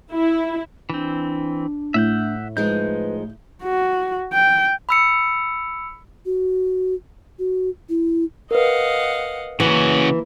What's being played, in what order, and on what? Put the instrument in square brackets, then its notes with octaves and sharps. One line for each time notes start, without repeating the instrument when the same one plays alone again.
[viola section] E4
[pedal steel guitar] E3 C4 [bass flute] D4
[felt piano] A2 [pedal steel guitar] E5 F#5 G6
[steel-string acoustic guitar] F3 G#3 D#4 [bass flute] B4 [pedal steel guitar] G6
[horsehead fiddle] F#4
G5
[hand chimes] B5 E6 C#7
[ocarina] F#4
F#4
E4
[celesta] A#4 B4 [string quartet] D#5 F5 F#5
[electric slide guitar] C#3 C#4 F#4 [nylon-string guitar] E3 [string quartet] A#3